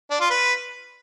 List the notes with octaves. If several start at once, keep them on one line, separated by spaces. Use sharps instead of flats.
D4
F4
B4